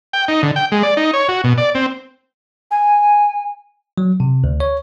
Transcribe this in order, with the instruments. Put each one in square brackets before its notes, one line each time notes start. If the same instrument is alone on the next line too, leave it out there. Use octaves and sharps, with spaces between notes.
[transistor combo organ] G5
D#4
D3
G5
G#3
D5
D#4
C#5
F#4
B2
D5
C4
[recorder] G#5
[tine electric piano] F#3
C3
D2
C#5